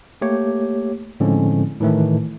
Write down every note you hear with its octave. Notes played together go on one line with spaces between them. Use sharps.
A3 A#3 G4 C#5
A2 D3 F3 G#3 C4 C#4
A2 D#3 E3 A3